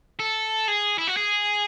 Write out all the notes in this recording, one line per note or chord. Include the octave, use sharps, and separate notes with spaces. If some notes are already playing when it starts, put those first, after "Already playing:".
A4
G#4
E4
F#4
G#4